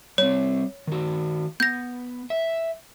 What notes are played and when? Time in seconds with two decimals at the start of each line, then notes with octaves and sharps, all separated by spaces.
0.18 G3 C4 C#5
0.87 D#3 F#4
1.60 B3 G6 A#6
2.30 E5